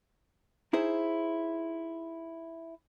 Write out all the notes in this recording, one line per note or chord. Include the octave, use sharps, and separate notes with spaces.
D#4 E4 G#4 C5